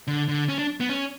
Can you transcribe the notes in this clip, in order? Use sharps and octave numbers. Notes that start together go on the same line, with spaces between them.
D3
D3
C#4
D4
B3
C#4